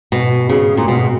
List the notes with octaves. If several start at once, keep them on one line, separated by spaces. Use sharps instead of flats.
B2
C#3
A#2
B2